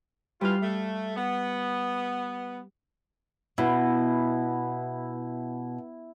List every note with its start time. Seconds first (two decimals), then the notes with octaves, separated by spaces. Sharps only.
0.41 E3 G3 F4 F5
0.62 A3
1.16 B3
3.58 B2 E4